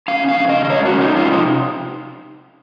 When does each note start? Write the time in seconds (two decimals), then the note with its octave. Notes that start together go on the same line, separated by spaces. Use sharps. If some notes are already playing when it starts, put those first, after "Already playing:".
0.08 C#4 F5
0.29 F2 F5
0.49 C#3 D#5
0.65 D#5
0.70 G#3 C#5
0.85 F#4
0.91 C#4
1.01 D#4
1.11 F2
1.16 F4
1.31 C3 D#4